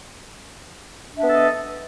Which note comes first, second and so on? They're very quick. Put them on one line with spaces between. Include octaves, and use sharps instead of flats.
D4 E5 B3 A4 D#5